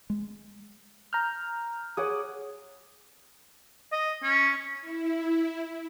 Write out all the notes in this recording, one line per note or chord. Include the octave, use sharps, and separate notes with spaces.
G#3
A#5 F6 G6
G#4 C#5 F#5 D6 D#6
D#5
C#4
E4